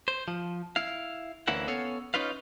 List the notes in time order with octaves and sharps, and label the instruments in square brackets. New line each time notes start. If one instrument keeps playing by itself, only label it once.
[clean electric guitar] C5
F3
E4 F5
D2 E3 A#3 C#4 E4 F#5
B3 C#4 A4 C#5 F5
C#4 D#4 F4 B4 F5